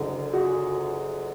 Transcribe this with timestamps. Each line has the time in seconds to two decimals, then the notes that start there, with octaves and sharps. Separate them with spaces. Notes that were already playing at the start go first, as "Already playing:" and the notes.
Already playing: F#1 F#2 D3 G#4
0.33 F#4 G#4